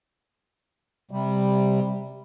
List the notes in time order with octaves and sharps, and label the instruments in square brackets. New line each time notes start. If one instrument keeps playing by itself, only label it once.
[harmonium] C3 G3